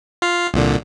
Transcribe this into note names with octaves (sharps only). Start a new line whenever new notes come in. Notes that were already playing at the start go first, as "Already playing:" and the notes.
F4 F5
C2 A#2 D3